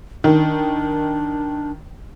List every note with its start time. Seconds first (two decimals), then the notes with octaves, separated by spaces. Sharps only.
0.24 D#3 D4